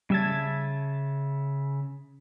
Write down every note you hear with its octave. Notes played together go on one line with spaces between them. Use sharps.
C#3 G3 E5 A5 G#6